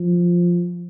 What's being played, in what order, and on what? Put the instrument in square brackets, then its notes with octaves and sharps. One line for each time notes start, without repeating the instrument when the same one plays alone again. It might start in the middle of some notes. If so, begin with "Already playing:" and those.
Already playing: [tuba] F3